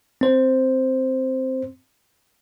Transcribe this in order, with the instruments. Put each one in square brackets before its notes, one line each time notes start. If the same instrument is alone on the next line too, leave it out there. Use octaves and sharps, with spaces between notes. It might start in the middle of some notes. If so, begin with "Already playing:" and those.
[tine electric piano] C4 C5